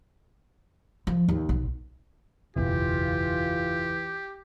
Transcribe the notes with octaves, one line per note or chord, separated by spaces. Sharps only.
F3
D#2
B1
F#1 B1 E2 E3 F4 G4